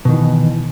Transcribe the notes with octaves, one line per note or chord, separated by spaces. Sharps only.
B2 D#3 E3